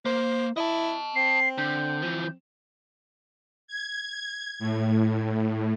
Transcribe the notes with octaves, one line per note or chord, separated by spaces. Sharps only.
A#3 C5
E4 D#5 A5
C4 C7
D3 G6
E3 F3
G#6
A2